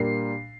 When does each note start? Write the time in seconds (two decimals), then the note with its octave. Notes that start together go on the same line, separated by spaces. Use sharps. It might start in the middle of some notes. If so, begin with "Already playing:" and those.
Already playing: A#2 G3 A#3 D4 C7